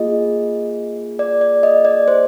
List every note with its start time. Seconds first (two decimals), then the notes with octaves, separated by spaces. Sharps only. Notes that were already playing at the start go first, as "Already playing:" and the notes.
Already playing: A#3 F4 G#4 D#5
1.19 D5
1.41 D5
1.63 D#5
1.85 D5
2.08 C5